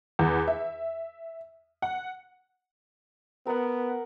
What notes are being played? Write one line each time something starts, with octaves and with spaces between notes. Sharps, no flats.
E2
E5
F#5
B3 A#4 F#5